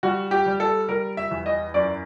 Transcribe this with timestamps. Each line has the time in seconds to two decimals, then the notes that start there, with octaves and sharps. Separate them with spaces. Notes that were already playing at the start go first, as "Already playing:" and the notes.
0.03 G3 F#4
0.31 G4
0.46 G3
0.60 A4
0.89 G3 A#4
1.17 E5
1.31 E2
1.46 D#5
1.74 F#2 D5